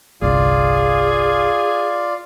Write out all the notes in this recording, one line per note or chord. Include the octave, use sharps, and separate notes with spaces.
G1 C2 D3 F4 G#4 D5 F5